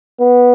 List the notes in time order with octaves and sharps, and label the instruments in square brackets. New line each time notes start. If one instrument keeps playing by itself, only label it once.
[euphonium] B3